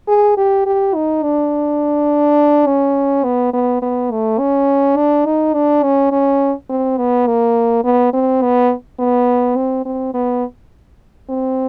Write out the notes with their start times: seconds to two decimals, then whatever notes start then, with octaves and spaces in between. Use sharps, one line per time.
0.08 G#4
0.37 G4
0.66 G4
0.95 D#4
1.23 D4
2.66 C#4
3.24 B3
3.53 B3
3.82 B3
4.11 A3
4.39 C#4
4.96 D4
5.26 D#4
5.54 D4
5.83 C#4
6.12 C#4
6.70 C4
6.98 B3
7.27 A#3
7.84 B3
8.13 C4
8.42 B3
8.99 B3
9.56 C4
9.85 C4
10.14 B3
11.29 C4